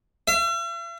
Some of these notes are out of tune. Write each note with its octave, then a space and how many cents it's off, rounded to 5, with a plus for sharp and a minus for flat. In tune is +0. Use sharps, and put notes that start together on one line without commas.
E5 +45